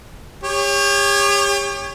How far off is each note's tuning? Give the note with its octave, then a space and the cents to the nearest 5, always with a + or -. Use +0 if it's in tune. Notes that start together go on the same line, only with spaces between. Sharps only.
G4 +40 C#5 +0